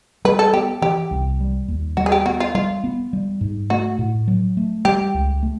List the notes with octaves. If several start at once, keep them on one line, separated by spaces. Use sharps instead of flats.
G3 B4
A4
B3 G4
E3 G4
C2
G3
D#2
G3 F#4
G#4
G4
B3 F#4
F4
G3 F4
B3
G3
G#2
A3 F#4
A2
F#3
A3
G3 G4
C#2
A3